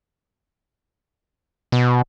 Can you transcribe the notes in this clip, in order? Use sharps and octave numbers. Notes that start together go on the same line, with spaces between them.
B2